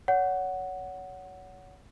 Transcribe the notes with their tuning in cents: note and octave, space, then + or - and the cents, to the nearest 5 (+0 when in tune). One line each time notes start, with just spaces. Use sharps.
C#5 +25 F#5 +0